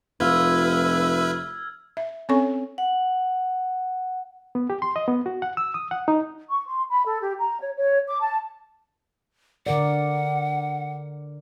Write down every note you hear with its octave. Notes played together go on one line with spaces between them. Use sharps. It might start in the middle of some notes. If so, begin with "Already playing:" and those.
F1 F4 B4 E5 E6 F6 G#6
E5
C4 C#4 A4 C#5 G#5 C#6
F#5
B3
G4
C6
D#5
B3
F#4
F#5
E6
D#6
F#5
D#4
C#6
C6
B5
A4
G4
A#5
C#5
C#5
D6
A5
D3 A#4 D5 F#5